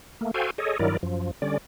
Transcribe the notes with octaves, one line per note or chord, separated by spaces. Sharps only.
A3 A#3
F#4 A4 C5 F5 G5 G#5
G#4 A4 C#5 D#5
G2 D#3 F#3 E4 A#4 D5
F#2 F3
D3 G3 C#4 D5